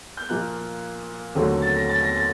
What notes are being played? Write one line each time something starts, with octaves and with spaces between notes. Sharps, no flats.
G6
A#2 F3 A#3 F#6
D#2 D3 F#3 A3 C4
A6
A#6
A6
A#6
A6